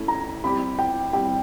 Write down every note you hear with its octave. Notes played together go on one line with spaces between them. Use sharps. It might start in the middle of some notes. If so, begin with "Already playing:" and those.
Already playing: A3 C#4 E4
A#5
G3 C4 E4 G4 B5
G5
G3 C4 E4 G4 G5